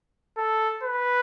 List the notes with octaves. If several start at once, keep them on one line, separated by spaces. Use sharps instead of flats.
A4
B4